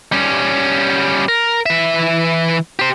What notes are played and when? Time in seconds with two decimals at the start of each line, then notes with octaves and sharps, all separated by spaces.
0.12 G3 C#4
1.28 A#4
1.66 E3 E5
2.79 G4 C5